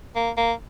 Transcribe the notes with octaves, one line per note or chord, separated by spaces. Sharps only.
A#3
A#3